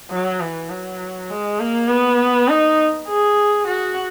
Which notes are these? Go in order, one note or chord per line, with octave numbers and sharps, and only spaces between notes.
F#3
E3
F#3
G#3
A#3
B3
D#4
G#4
F#4